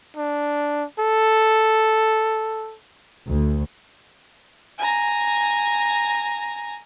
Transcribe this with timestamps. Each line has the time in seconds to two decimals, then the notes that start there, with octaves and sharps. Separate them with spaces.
0.17 D4
0.99 A4
3.28 D2
4.79 G#5 A#5